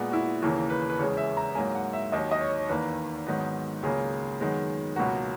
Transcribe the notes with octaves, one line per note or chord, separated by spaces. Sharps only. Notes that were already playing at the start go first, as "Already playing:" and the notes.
Already playing: A#2 G#3 B3
F#4
E4
D#2 C#3 E3 A#3
B4
B4
E2 C#3 G#3 C#5
E5
A#5
G#2 F#3 A#3 G#5
F#5
E5
D#2 D#3 F#3 D#5
D#5
C#5
E2 D#3 A#3 B4
G#2 D#3 F#3 B3
C#2 C#3 F#3 A#3 G#4
F#2 D#3 G#3 B3
C#2 B2 F#3 A#3 F#4